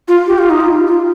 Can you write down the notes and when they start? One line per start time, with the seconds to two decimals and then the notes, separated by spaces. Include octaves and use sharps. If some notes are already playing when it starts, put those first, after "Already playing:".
0.08 F4
0.27 G4
0.38 F4
0.50 D#4
0.60 F4
0.87 F4